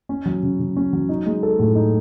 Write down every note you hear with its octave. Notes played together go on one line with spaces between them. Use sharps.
C#4
F#3
C#3
C#3
C#4
F#3
D#4
G#3
A4
A2
D#4